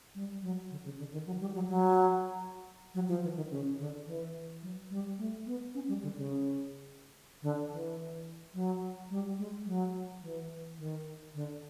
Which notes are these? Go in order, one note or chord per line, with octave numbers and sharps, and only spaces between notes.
G3
F#3
D3
C#3
D3
D#3
F#3
G3
F#3
F#3
F#3
F3
E3
D#3
C#3
D3
E3
F#3
G3
A3
B3
C#4
G3
D3
C#3
D3
E3
F#3
G3
G#3
F#3
E3
D#3
D3